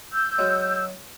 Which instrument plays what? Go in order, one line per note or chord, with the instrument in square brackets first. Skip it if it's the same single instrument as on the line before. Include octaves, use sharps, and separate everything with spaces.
[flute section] E6 G6
[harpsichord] F#3 G#3